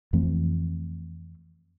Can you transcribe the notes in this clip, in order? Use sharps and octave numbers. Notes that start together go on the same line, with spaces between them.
F2 E3 A3 C4